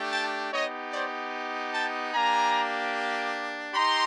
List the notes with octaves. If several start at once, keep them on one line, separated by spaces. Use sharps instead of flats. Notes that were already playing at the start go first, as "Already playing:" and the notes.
Already playing: A3 D4 G4
G5 A5
B3 D#4 G4 C#5 D#5
C5 D5
G5 A5
A#3 D4 G4 G#5 A#5
D#4 G4 A#5 C6